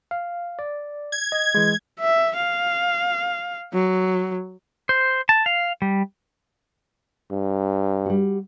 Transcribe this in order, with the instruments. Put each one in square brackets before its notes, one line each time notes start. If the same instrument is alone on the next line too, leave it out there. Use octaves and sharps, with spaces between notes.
[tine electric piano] F5
D5
[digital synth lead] G#6
[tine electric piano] D#5
E3 G#3
[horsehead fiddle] E5
F5
F#3
[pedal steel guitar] C5
A5
F5
G3
[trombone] G2
[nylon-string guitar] G3 F#4